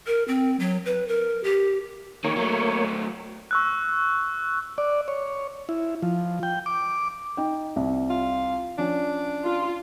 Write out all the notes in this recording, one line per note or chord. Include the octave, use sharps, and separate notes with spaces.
A#4
C4
F#3
B4
A#4
G4
E2 D#3 A#3 C#5
F#3 A3
C#6 E6 F#6
D5
C#5
E4
F3
G5
D6
D#4 G5
C2
F4
F3 C#4 D4
F4